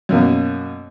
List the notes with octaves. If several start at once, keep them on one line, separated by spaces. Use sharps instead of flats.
F#2 B2 A#3